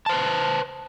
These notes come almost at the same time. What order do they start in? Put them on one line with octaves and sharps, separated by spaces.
A5 C5 B4